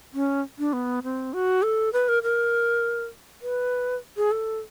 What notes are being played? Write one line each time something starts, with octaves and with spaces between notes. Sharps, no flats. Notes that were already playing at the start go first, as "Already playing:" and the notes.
C#4
D4
B3
C4
F#4
A4
B4
A#4
A#4
B4
G#4
A4